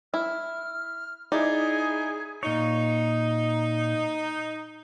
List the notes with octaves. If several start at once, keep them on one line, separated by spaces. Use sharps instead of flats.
E4 F6
D#4 E4 G#4 D5
A#2 D#4 C#5